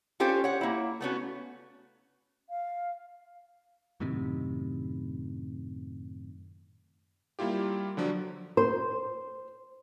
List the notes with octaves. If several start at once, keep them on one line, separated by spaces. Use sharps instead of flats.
C#4 F4 G4 A4 C5
C#5 F#5
A#3 E4
A3 B3 C#4 F#4
F5
F#2 A2 C3 D#3
G3 A#3 E4 F4 G4
D3 F3 F#3 D4
C5